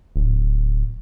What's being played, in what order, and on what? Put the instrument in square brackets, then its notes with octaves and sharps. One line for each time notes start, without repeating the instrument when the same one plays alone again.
[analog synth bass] D1